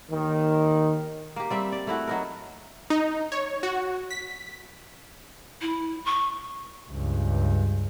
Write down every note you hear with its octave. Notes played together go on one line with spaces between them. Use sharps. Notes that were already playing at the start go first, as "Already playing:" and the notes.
D#2 D#3
A#3 G4
G3 C4 E5
D5
A3 E4 F#4
F#3 D#4 A#4
D#4
C#5
F#4
B6
E4
C#6
C#2 G2